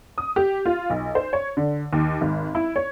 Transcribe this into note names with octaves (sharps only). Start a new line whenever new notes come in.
D#6
G4
F4
B1
C5
C#5
D3
D#2
G#1
E4
C#5